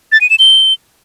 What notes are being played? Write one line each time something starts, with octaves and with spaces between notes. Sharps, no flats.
A6
D#7
E7
G7